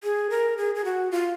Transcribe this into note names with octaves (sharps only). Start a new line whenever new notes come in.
G#4
A#4
G#4
G#4
F#4
F4